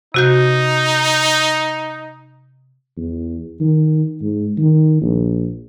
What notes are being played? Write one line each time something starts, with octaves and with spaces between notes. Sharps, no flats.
C3 D#4 F#4 G6
E2
D#3
G#2
D#3
A#1